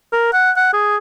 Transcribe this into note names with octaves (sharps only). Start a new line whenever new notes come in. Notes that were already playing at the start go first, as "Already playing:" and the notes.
A#4
F#5
F#5
G#4